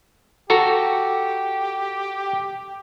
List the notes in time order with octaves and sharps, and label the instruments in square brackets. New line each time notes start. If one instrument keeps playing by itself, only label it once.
[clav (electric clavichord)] F#4 A4 A#5 [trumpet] G4